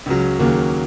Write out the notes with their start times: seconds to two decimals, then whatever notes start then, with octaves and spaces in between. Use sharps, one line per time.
0.06 C#2 C#3 F#3
0.39 D#2 C#3 F#3 A#3